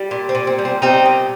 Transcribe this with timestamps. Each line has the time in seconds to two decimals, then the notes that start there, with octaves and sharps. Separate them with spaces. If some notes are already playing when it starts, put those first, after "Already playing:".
Already playing: G3
0.11 A#2
0.29 C4
0.35 A#2
0.47 C4
0.58 G3
0.65 C4
0.82 G3 C4 D#4
1.06 A#2